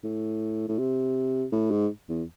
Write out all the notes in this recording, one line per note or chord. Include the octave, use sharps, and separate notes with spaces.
A2
A2
C3
A2
G#2
E2